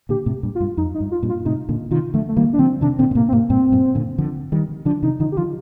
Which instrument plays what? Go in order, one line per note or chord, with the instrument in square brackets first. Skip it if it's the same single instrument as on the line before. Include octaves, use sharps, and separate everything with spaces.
[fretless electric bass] A#2 D3 [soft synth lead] G4
[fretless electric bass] A2 C3
G2 A#2
[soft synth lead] F4
[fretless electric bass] G2
[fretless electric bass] F2 [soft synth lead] D#4
[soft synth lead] D#4
[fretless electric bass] G2
[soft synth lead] F4
[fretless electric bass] G2 A#2
[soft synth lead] F4
[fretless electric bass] A2 C3 [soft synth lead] D#4
[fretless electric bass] A#2 D3
[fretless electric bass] C3 D#3 [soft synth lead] F4
[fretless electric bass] D3 F3 [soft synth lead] A3
[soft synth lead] A3
[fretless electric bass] D#3 G3 [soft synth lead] A#3
[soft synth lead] D4
[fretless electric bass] D3 F3 [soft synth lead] C4
[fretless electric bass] C3 D#3 [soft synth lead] D4
[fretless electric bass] A#2 D3 [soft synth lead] C4
[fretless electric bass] A#2
[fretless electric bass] A2 C3 [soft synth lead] A#3
[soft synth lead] C4
[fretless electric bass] A2 C3 [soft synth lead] A#3
[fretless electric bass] G2 A#2 [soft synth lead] C4
[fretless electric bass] G2 A#2
A#2 D3
D3 F3
D#3 G3
[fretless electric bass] D3 F3 [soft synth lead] D4
[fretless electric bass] C3 D#3 [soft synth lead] D#4
[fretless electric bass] D3 F3 [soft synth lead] D#4
[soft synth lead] G4
[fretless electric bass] D3 F3 [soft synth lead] F4